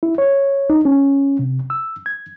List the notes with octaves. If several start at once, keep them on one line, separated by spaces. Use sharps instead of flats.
E4
C#5
D#4
C#4
C3
E6
G#6